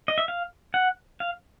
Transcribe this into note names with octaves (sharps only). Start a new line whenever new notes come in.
D#5
E5
F5
F#5
F5